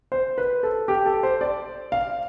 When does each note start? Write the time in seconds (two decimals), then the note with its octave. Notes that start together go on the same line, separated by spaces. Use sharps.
0.12 C5
0.38 B4
0.63 A4
0.88 G4
1.06 A4
1.23 C5
1.41 D5
1.92 F5